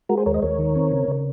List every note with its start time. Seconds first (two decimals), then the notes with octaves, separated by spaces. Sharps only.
0.09 G#3 F#4 A#4
0.17 G#4 C5
0.26 D#2 A#4 C#5
0.34 C5 D#5
0.42 D#2 A#4 C#5
0.59 D#3
0.76 C4
0.92 C#3
1.08 C#3